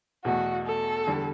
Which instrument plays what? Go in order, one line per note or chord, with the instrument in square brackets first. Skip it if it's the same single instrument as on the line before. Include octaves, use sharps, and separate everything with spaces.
[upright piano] E2 B2 A3 [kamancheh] F#4
[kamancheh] A4
[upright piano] E2 D3 G3